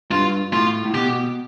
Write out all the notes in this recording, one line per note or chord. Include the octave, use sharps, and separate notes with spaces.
G2 F4
A2 F4
A2
B2 G4